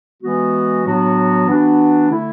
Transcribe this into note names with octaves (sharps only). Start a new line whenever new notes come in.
E3 G#3 B3 F#4
A2 F#3 B3 D4 F#4
E3 B3 D4 F#4
D3 A3 E4